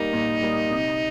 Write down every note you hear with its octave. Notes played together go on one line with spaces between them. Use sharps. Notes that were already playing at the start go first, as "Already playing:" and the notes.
Already playing: G3 A#3 D#4
A#2
G3 A#3
C3